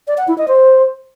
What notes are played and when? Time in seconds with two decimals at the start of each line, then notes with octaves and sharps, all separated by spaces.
0.08 D5
0.18 F#5
0.28 E4
0.38 D#5
0.48 C5